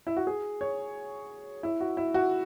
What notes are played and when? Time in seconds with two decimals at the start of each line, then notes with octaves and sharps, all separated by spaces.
0.07 E4
0.17 F#4
0.27 G#4
0.61 C#5
1.63 E4
1.81 F#4
1.97 E4
2.14 F#4